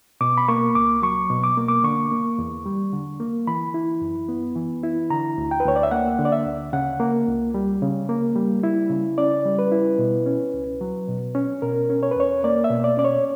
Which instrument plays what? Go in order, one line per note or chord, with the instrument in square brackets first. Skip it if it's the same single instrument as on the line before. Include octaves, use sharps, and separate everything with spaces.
[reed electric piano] B2 D6
B5
A#3 C#6
C#2 D6
F#3 C#6
B2
D6
A#3
D6
D3 C#6
A#3
E2
G3
D3
A#3
E3 B5
E4
F#2
B3
E3
E4
D3 A#5
D2
G5
B4
D2 C#5
D5
E5
A#3 F#5
D3
D5
E5
D2
C#3 F#5
A#3
C#2
G3
C#3
A#3
G3
E4
C#3
C#4 D5
G3
B4
E4
B2
C#4
C#2
F#3
B2
C#4
B2 A#4
C#4
C#5
B4
E2 C#5
A#3 D5
E5
B2
D5
C#4 D5
C#5